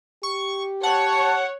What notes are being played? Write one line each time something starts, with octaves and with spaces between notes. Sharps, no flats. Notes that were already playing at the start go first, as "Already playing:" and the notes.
G4 C#6
C#5 F#5 A5